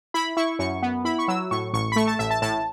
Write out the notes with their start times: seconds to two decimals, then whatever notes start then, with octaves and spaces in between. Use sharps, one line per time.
0.14 E4 B5
0.37 E4 C#6
0.59 F#2 C#6
0.82 B3
1.05 E4 B5
1.19 C#6
1.28 F#3 E6
1.51 A2 C#6
1.73 A1 C#6
1.92 B5
1.96 A3 C#6
2.08 A5
2.19 A1 E5
2.31 A5
2.42 A2 A5